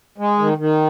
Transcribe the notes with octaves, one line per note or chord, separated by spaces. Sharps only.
G#3
D#3
D#3